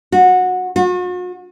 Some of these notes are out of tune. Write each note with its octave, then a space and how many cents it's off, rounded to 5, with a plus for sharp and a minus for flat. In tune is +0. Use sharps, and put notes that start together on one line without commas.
F#4 -20
F#4 -45